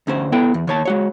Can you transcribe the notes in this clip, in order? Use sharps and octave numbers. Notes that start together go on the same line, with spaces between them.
D2 C#4 C5
B3 E4 A4 G5
E2
D#2 C#5 A5
G#3 F#4 C#5